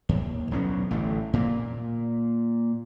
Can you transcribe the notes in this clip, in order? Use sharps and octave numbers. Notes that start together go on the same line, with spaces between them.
D#2
B1 F#3 B3 C#4
A1 D3 A3
A#2 A#3